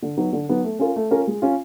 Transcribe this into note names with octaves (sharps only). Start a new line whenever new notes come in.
D3
F#3 B3 D#4
D3
F#3 B3 D#4
A3
C#4 F4 A#4
A3
C#4 F4 A#4
G#3
C#4 F4